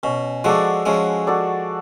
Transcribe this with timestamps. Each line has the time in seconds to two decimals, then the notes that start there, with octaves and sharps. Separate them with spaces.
0.03 B2 C#4
0.44 F3 G#3 F#4 A4 D5
0.86 F3 G#3 C#4
1.27 F#4 A4 D5